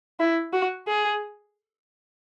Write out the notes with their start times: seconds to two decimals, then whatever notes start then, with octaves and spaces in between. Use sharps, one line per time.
0.20 E4
0.53 F#4
0.87 G#4